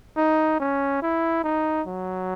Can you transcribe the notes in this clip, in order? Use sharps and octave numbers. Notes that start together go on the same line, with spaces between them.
D#4
C#4
E4
D#4
F#3